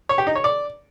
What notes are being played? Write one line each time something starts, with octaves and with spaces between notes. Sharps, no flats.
C#5
G4
D#4
C#5
D5